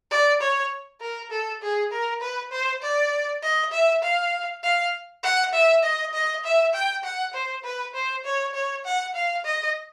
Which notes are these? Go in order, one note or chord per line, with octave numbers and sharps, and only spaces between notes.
D5
C#5
A#4
A4
G#4
A#4
B4
C5
D5
D#5
E5
F5
F5
F#5
E5
D#5
D#5
E5
G5
F#5
C5
B4
C5
C#5
C#5
F#5
F5
D#5